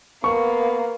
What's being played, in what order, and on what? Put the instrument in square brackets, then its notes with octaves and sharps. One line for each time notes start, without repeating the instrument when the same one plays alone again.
[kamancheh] A#3 [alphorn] B3 [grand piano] C#6